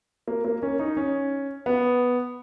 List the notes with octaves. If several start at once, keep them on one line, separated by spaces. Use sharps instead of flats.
A#3
A#3
C#4
D#4
C#4
B3